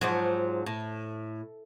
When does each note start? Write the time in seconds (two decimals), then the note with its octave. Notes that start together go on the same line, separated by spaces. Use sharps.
0.01 G#2 F3 F#3
0.66 A2